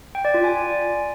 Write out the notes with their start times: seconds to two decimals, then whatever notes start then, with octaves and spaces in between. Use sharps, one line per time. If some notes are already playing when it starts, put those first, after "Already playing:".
0.15 G5
0.25 D5
0.34 F4
0.44 G#5